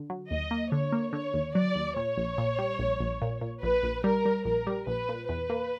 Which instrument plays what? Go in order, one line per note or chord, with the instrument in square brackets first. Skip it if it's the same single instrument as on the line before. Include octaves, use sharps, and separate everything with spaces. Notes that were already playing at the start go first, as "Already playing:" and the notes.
Already playing: [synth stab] D3
F#3
[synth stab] D#2 [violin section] D#5
[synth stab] A#3
[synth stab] D3 [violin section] C#5
[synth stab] A#3
[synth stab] D3 [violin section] C#5
[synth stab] D#2
[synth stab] F#3 [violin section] D5
[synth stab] D#2
[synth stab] A#2 [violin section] C#5
[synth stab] A#1
A#2
G3
A#1
A#1
A#2
A#2
[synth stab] A#1 [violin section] B4
[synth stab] A#1
[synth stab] G3 [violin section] A#4
[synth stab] G3
[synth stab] A#1 [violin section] A#4
[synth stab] G3
[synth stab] A#1 [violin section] B4
[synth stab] A#2
[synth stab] E2 [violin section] B4
[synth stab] A#3